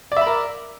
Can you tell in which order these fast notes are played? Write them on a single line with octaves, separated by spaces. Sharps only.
D5 E5 B5 A#4